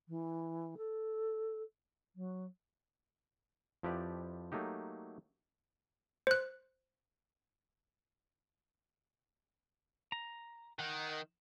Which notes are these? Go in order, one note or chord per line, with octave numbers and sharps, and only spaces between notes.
E3
A4
F#3
F2 F3 E4 G4 B4 D5
F#3 A3 A#3 D#4 G4
C5 F#6
A#5
D#3 F#5